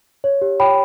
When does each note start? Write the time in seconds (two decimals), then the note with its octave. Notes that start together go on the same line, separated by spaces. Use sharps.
0.24 C#5
0.42 G4
0.60 C#5 G5 B5